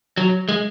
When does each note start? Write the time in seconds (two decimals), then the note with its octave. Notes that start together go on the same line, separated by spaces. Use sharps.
0.17 F#3
0.49 G#3